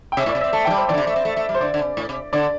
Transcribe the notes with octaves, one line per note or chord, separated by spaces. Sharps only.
G5
C3 E5
A2
D5
C3
C4 E5
A3 A5
E3 G5
G3
C5
E3 D5
D3
C3
A3
C4
A3
A3
G3
C5
D3 D5
D3
C3
A2
C3
D3 D5